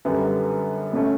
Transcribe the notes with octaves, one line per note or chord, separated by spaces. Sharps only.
F#2 D3 G3 B3
B2 A3 C#4